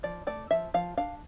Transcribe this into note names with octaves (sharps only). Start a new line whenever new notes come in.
F3 D5
A3 D5
F3 E5
F3 F5
D4 F5